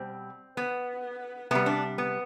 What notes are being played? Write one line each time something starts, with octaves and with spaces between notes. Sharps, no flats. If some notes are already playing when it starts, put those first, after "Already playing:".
Already playing: B2 G3 C4
B3
C3 G3 B3
D4
B3